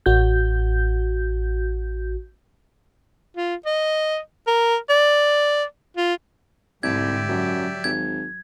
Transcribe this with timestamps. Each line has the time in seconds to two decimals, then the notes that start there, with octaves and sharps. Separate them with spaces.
0.06 A1 F#4 G6
3.36 F4
3.66 D#5
4.47 A#4
4.89 D5
5.97 F4
6.83 C2 G#2 D3 G4 D5 E5 G#6
7.29 F#2 F#3
7.84 G#1 G#6